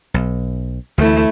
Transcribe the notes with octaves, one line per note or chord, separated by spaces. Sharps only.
B1
D2 E3 A3 E4